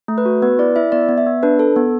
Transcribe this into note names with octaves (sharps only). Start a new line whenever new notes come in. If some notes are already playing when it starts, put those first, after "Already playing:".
A3
B4
F#4
B3 B4
E4 D5
E4 E5
B3 D5
B3
E5
B3
D4 B4
A4
B3